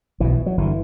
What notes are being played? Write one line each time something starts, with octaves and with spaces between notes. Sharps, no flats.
B1 B2 E3
F#3
G1 D3 E3